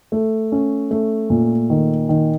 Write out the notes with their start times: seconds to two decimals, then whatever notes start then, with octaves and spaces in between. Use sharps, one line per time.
0.12 A3
0.52 C#4
0.91 A3
1.30 A#2
1.70 D#3
2.09 D#3